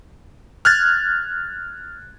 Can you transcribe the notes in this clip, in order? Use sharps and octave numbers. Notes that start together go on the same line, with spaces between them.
F6 F#6 G#6 A6